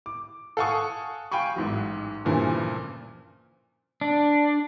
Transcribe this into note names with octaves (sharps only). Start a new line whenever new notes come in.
D6
A4 F5 F#5 G#5 C#6 D#6
F5 G5 G#5 B5 C#6
A1 G#2 F#3
D2 G2 A#2 C#3 E3 F3
D4